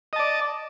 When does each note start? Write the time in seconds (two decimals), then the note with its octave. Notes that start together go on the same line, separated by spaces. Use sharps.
0.13 D#5
0.16 A5
0.19 D5